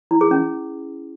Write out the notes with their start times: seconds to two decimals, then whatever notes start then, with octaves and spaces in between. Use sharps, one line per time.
0.11 E4
0.21 G#4
0.31 C#4